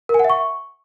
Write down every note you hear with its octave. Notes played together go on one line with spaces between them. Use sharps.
A#4
G#5
F#5
E5
C#6